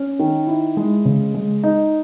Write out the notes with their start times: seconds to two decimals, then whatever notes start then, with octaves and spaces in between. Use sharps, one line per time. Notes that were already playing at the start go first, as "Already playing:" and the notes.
Already playing: C#4
0.19 D#3
0.47 E4
0.77 G#3
1.05 C#3
1.34 G#3
1.64 D#4